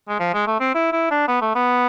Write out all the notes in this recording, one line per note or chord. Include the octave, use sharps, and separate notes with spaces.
G#3
F3
G#3
A3
C4
E4
E4
D4
B3
A3
B3